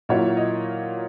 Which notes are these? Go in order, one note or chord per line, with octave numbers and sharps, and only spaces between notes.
A#2 F#3 A#3 E4 C#5
D#5